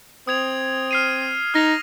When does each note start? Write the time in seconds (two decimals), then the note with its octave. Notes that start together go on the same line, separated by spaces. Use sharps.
0.27 C4 D#6 G#6 F7
0.91 F6 C7 D#7
1.54 D#4 F6 A#6 F7